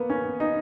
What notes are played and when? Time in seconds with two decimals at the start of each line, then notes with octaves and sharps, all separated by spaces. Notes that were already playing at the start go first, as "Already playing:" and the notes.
Already playing: A#3 B3
0.10 C#4
0.40 D#4